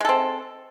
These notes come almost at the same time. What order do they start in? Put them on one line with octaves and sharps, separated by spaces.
G#3 A4 C4